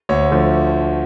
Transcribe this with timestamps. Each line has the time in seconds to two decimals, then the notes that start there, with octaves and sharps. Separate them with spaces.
0.09 D2 C#5
0.31 D3 F3 A3